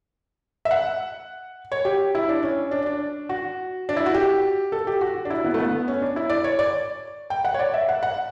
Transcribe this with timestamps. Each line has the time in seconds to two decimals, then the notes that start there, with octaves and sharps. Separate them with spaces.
0.65 E5
0.71 F#5
1.72 C#5
1.85 G4
2.15 E4
2.29 D4
2.43 C#4
2.71 D4
2.86 D4
3.29 F#4
3.89 D4
3.97 E4
4.06 F#4
4.14 G4
4.72 A4
4.87 G4
5.01 F#4
5.25 D4
5.30 E4
5.44 B3
5.54 A3
5.58 B3
5.88 C#4
6.02 D4
6.16 E4
6.30 D5
6.44 C#5
6.59 D5
7.30 G5
7.45 F#5
7.54 C#5
7.59 D5
7.74 E5
7.89 F#5
8.03 F#5